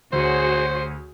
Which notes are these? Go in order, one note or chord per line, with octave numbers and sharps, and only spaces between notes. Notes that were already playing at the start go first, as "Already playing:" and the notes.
D2 F#4 G#4 C5 C#5